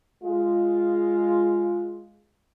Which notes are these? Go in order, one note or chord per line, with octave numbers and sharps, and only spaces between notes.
G#3 F4